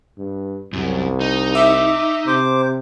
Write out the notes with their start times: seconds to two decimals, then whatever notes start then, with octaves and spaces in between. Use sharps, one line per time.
0.18 G2
0.73 C2 F#2
1.21 D#4
1.55 E5 D6
2.27 C3 C5 D6